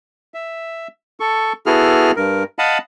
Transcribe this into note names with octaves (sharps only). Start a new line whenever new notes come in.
E5
A4 C#6
B3 E4 F#4 G#4 A4 F6
G2 A#4
D#5 F5 F#5 A5 B5